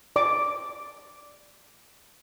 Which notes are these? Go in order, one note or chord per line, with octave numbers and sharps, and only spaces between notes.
D5 D6